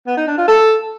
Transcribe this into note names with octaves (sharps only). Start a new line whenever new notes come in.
B3
D#4
D4
F4
A4